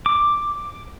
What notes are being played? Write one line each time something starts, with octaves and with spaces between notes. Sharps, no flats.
D6